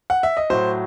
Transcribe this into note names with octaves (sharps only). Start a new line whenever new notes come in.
F#5
E5
D#5
A2 F#3 C5